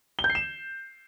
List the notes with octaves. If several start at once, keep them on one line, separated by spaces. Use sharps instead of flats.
G7
G6
C7
E7